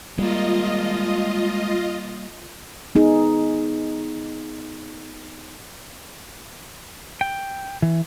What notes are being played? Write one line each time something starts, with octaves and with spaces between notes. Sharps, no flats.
G3 G#3 A#3 F4 A#4 D#5
B3 D#4 G#4
G5
E3